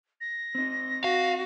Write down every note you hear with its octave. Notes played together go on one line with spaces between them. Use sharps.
A#6
C4 D#4
F#4 F5